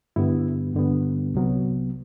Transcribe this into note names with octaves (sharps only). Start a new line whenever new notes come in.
G2 D3 G3 B3 E4
G2 D3 G3 B3
C2 C3 F#3 B3